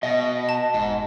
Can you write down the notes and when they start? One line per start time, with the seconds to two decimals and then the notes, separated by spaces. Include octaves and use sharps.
0.03 B2 D#5
0.49 A5
0.74 F1 G#2